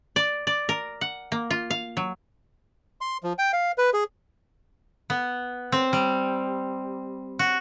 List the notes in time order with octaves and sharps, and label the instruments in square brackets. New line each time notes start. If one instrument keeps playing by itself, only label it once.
[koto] D5
D5
A#4
F#5
A#3
F4
F5
F#3
[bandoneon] C6
F3
G5
F5
B4
G#4
[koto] B3
C4
G3
F#4